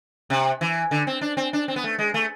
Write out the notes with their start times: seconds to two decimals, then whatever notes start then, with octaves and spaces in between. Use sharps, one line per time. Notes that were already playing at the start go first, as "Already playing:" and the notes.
0.30 C3
0.61 E3
0.91 D3
1.07 C4
1.21 D4
1.37 C4
1.53 D4
1.68 C4
1.76 B3
1.84 A3
1.99 G#3
2.14 A3